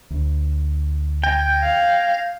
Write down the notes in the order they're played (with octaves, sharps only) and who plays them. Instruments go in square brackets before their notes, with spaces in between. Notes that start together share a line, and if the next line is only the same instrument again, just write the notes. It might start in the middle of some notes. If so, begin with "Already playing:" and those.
[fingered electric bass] D2
[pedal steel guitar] G5 [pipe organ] G6 G#6 A#6
[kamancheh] F5